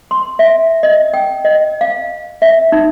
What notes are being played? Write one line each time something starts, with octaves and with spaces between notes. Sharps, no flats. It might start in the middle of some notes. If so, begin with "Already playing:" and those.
C6
E5
D#5
G5
D#5
F5
E5
D#4